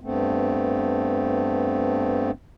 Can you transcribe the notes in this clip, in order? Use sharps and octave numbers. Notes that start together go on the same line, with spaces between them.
G2 A3 B3 C4